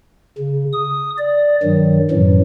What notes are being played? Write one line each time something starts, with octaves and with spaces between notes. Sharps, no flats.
C#3
D#6
D5
G2 D#3 F#3
F#2 A2 E3 F#3